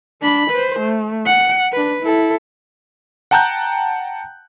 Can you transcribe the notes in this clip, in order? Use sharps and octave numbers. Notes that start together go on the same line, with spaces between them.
D4 B5
B4 C5
A3
F#5
D4 B4
E4 A4
F#5 G5 A5 A#5 F#6 G6